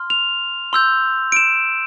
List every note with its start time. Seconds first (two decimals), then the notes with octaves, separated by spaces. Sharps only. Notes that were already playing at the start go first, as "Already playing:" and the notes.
Already playing: C6 F6
0.10 F7
0.73 C6 E6 G6
1.32 D7
1.36 E7